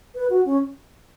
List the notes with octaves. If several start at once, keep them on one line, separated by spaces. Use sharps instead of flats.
B4
F#4
C#4